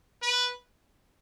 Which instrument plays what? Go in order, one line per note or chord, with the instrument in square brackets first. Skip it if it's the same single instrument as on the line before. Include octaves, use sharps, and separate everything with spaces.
[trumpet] B4